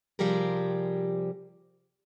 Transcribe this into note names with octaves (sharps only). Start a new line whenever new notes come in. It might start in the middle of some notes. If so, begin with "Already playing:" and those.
C3 F3 G3 G4 G#4 A#4